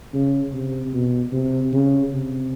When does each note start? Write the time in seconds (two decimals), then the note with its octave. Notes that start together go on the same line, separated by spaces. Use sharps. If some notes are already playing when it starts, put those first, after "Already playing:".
0.14 C#3
0.54 C3
0.94 B2
1.32 C3
1.73 C#3
2.12 C3